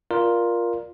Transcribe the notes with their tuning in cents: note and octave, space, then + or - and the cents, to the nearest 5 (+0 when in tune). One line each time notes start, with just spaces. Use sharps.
F4 +0 A#4 +10 D5 +0